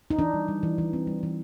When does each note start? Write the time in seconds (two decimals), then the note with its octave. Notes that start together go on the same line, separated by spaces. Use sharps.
0.10 D#4
0.19 E3 D4
0.34 G3
0.48 G3
0.63 E3
0.78 E3
0.93 C4
1.07 G3
1.23 E3